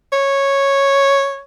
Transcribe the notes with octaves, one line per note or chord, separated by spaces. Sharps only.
C#5